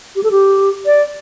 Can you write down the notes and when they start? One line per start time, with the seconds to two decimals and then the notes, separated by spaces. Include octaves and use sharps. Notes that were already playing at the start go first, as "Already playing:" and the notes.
0.16 G4
0.23 A4
0.31 G4
0.86 D5